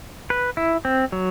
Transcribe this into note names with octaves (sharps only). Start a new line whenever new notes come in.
B4
E4
C4
F#3